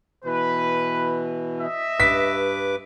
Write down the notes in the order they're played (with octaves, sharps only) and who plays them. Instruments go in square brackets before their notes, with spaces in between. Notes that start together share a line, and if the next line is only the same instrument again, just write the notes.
[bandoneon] B2 E3 [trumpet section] B4
[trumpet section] D#5 E5
[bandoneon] G2 B4 D6 [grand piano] B6